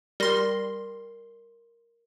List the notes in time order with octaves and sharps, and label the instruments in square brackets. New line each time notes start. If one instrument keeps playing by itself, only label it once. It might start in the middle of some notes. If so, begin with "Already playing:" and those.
[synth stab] G3 C6 [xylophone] A#4 A#6